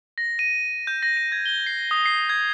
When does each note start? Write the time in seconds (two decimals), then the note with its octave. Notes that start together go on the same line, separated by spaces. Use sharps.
0.18 A#6
0.39 D#7
0.87 G6
1.03 A#6
1.17 D#7
1.32 G#6
1.46 G7
1.67 C7
1.91 D#6
2.06 C7
2.30 G#6